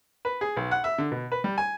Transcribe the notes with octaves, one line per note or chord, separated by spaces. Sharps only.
B4
G#4
B1
F#5
E5
D3
B2
B4
G3
G#5